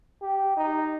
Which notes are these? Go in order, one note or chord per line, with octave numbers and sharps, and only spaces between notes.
G4
D#4